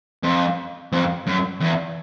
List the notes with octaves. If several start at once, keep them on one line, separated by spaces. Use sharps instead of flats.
F2
F2
F#2
E2